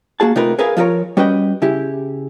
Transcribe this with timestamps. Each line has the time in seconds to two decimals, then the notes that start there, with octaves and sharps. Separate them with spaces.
0.20 A#3 F#4 G#4 A5
0.36 C3 A3 D#4 F4 A#4 B4
0.59 G#4 A#4 B4 E5 F5 G#5
0.77 F3 F4 F#4 A4 A#4 C#5
1.17 G3 C#4 F#4 B4 D#5 G5
1.62 C#3 E4 G4